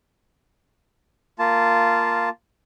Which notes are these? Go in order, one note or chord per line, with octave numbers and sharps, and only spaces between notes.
A#3 F4 A5